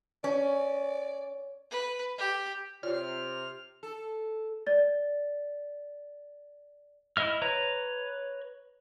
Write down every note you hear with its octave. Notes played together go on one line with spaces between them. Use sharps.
C#4 D5
B4
G4
C3 F4 C#5 D5 F6
A4
D5 A6
E4 D#5 E5 F6
B4 C#5 A#5